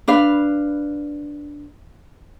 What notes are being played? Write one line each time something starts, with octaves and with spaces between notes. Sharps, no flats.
D4 B4 F5